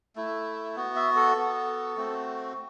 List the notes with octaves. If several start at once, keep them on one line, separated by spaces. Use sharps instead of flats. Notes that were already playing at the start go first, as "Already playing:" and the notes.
A3 E4
B3 F#4
E5
A4
B3 F#4
A3 C4 F#4